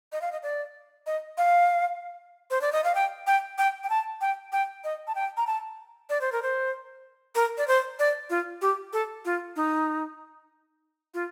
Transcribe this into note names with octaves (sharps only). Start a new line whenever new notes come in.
D#5
F5
D#5
D5
D#5
F5
C5
D5
D#5
F5
G5
G5
G5
G5
A5
G5
G5
D#5
A5
G5
A#5
A5
D5
C5
A#4
C5
A#4
D5
C5
D5
F4
G4
A4
F4
D#4
F4